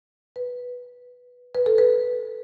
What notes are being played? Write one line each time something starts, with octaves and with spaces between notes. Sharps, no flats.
B4
B4
A4
B4